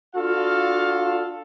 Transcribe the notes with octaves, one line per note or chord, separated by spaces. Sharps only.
D4 F4 F#4 A4 F5